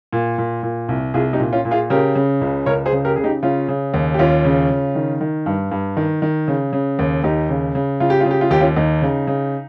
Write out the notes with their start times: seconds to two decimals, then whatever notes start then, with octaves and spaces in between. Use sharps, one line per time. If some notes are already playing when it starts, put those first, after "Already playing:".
0.13 A#2
0.38 A#2
0.63 A#2
0.89 C2
1.14 C2 F4 G#4
1.33 D#4 G4
1.40 A#2
1.52 C#4 F4
1.65 A#2
1.71 F4 G#4
1.90 C#3 G4 A#4
2.15 C#3
2.41 C#2
2.66 C#2 A#4 C#5
2.86 G#4 C5
2.92 C#3
3.05 G4 A#4
3.16 C#3 G#4
3.24 D#4 G4
3.43 C#3 C#4 F4
3.68 C#3
3.94 D#2
4.14 G4
4.19 D#2 C#4 F4
4.45 C#3
4.70 C#3
4.95 D#3
5.21 D#3
5.46 G2
5.71 G2
5.97 D#3
6.22 D#3
6.48 C#3
6.73 C#3
6.99 D#2
7.24 D#2 D#4 G4
7.49 C#3
7.75 C#3
8.00 C#3 F4
8.10 G4
8.20 F4
8.25 C#3
8.31 G4
8.41 F4
8.51 D#2 G4
8.61 C#4 F4
8.76 D#2 D#4
9.02 C#3
9.27 C#3